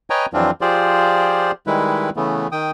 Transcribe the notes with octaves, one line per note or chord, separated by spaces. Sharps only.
B4 C#5 D#5 G5 G#5 A#5
F2 E3 F#3 C4 D4 F4
F3 F4 G4 G#4 C5 D5
D#3 G3 G#3 E4 B4
C#3 E3 A3 B3
D#3 G5 D#6